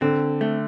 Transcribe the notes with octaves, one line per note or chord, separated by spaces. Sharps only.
D3 C4
A3